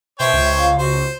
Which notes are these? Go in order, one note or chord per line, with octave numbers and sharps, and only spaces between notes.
B2 C5 C#5 E5 G5
C#2
F5
C#2 F#4 C5